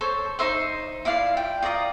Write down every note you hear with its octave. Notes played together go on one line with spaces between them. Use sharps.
A4 C5 C#5
D#4 C5 E5 C6
E4 F4 D5 F5
G5
F4 D5 A#5 D#6